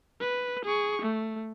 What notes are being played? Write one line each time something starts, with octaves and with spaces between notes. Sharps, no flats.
B4
G#4 C#6
A3